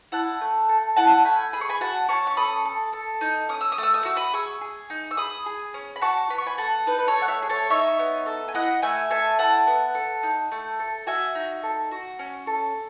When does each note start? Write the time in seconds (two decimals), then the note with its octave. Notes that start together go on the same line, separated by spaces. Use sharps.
0.12 E4 F#5 A5
0.41 A3
0.69 A4
0.96 E4 F#5 A5
1.24 A3 G#5 B5
1.53 G#4 B5
1.61 C#6
1.69 G#5 B5
1.81 F#4 F#5 A5
2.09 C#4 A5 C#6
2.27 C#6
2.37 A4 B5 D#6
2.65 A4
2.93 A4
3.21 D#4
3.49 C#4 D#6
3.61 E6
3.72 D#6
3.78 A3 E6
3.94 D#6
4.05 F#4 E6
4.16 B5 D#6
4.33 G#4 C#6 E6
4.61 G#4
4.90 D#4
5.11 E6
5.17 G#4 B5 D#6
5.46 G#4
5.74 C#4
5.96 B5
6.02 F#4 A5 C#6
6.30 B3 B5
6.38 C#6
6.46 G#5 B5
6.58 A4 F#5 A5
6.86 D#4 B4
6.99 B4
7.07 A4 C#5
7.14 A3
7.22 F#5
7.28 C#5 E5
7.42 G#4
7.50 A4 C#5
7.70 D#4 C#5 E5
7.99 B3
8.26 A4
8.48 G#5
8.54 E4 D#5 F#5
8.82 A3 E5 G#5
9.10 A4 E5 G#5
9.39 E4 F#5 A5
9.67 B3
9.95 A4
10.23 D#4
10.52 A3
10.80 A4
11.07 F#4 E5 G#5
11.35 D#4
11.63 A4
11.91 F#4
12.19 C#4
12.47 A4